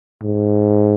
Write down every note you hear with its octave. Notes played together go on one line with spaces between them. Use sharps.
G#2